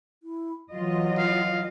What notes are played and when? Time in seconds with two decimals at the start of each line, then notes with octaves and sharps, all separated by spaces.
0.23 E4
0.72 E3 F#3 F4 D#5
1.18 F5